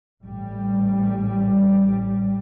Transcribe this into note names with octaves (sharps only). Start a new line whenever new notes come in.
A1 G3